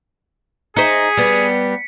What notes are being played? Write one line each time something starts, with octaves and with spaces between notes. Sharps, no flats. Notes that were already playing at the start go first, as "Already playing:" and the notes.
D#4 G#4 C5 B6 C#7
G3 B3